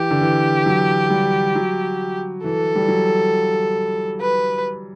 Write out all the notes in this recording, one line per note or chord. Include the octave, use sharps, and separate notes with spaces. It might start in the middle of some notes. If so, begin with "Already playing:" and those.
Already playing: E3 G4
D3
E3
F#3
G3
F#3
E3 A4
G3
F#3
B4